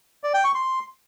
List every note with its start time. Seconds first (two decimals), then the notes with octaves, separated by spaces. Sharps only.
0.24 D5
0.34 G5
0.44 C#6
0.55 C6